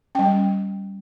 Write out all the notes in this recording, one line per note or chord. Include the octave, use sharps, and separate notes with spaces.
G3 C#4 G5